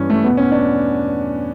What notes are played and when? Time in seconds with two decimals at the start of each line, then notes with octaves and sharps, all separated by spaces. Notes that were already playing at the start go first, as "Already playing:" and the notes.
Already playing: G2 E3 C#4
0.10 A3
0.24 E2 B2 B3
0.37 C#4
0.51 D4